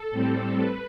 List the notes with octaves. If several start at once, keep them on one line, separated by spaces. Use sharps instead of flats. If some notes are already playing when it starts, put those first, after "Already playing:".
Already playing: A4
A2 G3 C4
B4